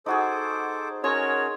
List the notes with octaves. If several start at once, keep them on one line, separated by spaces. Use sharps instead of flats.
D#4 F#4 G#4 A4 C5 D6
C#4 F#4 G#4 A#4 C#5 C6